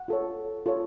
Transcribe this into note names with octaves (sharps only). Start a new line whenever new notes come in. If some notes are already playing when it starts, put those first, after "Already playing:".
Already playing: F#5
F4 A4 C#5
F4 A4 C#5